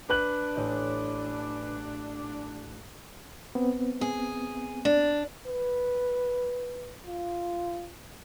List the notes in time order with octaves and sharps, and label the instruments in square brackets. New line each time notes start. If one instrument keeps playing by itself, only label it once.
[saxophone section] D4 [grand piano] B4 F#6 F#7
[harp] A1 D#5 G6
[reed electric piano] B3 C4
[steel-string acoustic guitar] G#4
D4
[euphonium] B4
F4